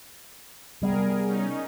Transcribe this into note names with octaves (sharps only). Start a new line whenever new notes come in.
C3 G3 B3 G#4 A#4
C#4 D#4